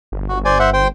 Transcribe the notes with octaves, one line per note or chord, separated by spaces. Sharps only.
G1
F#4
C5 D5 G#5
C5 E5 F#5
C5 G5